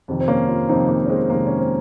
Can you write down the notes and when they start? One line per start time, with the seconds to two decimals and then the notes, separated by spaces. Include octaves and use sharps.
0.08 F2 C3 D#3
0.20 C4
0.28 A#3 C#4
0.48 C#4 F4
0.69 F2 C3 D#3 C4 D#4
0.89 A#3
1.06 C#4
1.09 G#3 C4
1.30 F2 C3 D#3 A#3
1.47 C#4
1.59 C4